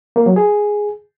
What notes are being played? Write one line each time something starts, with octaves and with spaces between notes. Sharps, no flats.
A#3
F#3
G#4